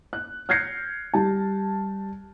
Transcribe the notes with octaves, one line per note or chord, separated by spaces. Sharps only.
F#6
F6 G6 G#6 A#6 C7 C#7
G3 A5